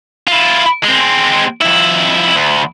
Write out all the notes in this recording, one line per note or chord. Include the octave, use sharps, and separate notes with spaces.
E4 F4
G#3 C4
F2 E4
D2